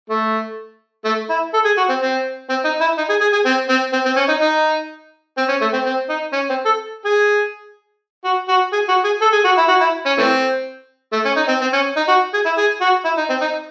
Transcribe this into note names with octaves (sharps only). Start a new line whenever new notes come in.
A3
A3
E4
A4
G#4
F#4
C4
C4
C4
D#4
E4
D#4
G#4
G#4
G#4
C4
C4
C4
C4
C#4
D#4
D#4
C4
C#4
A3
C4
C4
D#4
C#4
C4
A4
G#4
F#4
F#4
G#4
F#4
G#4
A4
G#4
F#4
E4
F#4
E4
C#4
E3 A3 C4
A3
C#4
D#4
C4
C4
C#4
D#4
F#4
G#4
E4
G#4
F#4
E4
D#4
C4
D#4